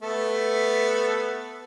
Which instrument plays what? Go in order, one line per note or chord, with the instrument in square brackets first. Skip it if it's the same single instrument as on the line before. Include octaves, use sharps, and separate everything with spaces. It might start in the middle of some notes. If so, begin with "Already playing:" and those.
[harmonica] A3 B3 A4